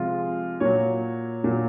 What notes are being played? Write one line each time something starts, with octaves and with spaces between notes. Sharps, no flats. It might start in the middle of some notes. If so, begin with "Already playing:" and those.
Already playing: C3 F3 G#3 F4
A#2 F#3 C#5
A#2 F#3